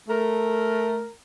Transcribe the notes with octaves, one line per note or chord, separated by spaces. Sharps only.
A3 A#4